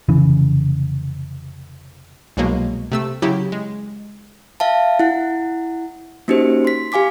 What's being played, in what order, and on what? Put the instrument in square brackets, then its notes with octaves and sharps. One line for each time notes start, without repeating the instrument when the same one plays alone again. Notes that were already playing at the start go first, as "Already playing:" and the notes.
[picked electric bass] F1 C#3 E3
[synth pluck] C2 B2 F#3 G#3 A#3
C3 A3 E6
C#3 F#3 E4 G4
G#3
[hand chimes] E5 F5 A5
E4 F#5
A#3 C#4 D#4 F#4 G4 C5
C6 B6
G4 F5 G#5 D6 B6